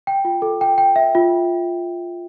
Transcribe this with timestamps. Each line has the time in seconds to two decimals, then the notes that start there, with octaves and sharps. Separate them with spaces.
0.07 G5
0.25 F4
0.42 A4
0.61 G5
0.78 G5
0.96 E5
1.15 F4